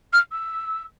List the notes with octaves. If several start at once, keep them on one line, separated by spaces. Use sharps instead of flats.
F6
E6